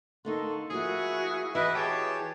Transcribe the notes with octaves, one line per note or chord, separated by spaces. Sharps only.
D3 A#3 D#4 A4 C6 C#6
F3 A#3 E4 F#4 G#4
E3 E4 F#4 B4 D#5
G4 G#4 C#5 A5